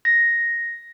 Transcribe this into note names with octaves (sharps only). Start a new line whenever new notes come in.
A#6